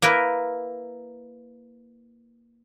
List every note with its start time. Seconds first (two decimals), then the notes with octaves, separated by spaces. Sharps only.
0.02 A#3 E4 A#4 B4